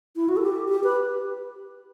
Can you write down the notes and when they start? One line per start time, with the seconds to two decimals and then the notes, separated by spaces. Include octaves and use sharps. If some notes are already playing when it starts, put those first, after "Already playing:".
0.16 E4
0.29 F#4
0.37 A4
0.43 G4
0.69 G4
0.84 B4